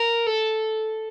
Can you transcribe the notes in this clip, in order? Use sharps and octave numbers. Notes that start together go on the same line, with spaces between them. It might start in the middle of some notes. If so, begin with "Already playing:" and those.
Already playing: A#4
A4